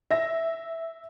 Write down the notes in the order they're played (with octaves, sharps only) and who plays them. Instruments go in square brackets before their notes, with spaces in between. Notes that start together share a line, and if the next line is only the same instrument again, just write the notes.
[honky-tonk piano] E5 A#6